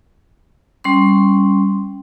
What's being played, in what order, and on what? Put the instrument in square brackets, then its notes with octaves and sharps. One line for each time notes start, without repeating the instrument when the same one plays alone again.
[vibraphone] G3 C#4 C6